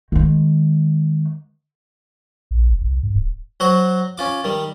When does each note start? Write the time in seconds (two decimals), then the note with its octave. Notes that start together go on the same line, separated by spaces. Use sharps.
0.12 D#3 G#3
2.51 A#1
2.69 G1
2.82 C2
3.03 G2
3.15 D1
3.60 F#3 F#4 C5
4.18 C#4 F4 D6
4.44 D#3 G3